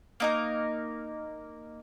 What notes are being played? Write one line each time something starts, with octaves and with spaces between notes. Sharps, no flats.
A#3 D#4 A#4